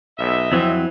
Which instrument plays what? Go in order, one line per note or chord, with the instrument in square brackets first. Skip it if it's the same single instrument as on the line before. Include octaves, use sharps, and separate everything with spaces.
[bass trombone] B1 [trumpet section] D#5 E5
[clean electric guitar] F2 F#3 [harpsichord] E3 [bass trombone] C4